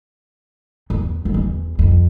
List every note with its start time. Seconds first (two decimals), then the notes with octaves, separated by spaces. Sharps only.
0.90 E2
1.25 F2
1.34 E2
1.79 F2